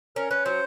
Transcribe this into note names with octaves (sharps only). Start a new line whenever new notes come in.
C#4 A#4
C#4 B4
F#3 C5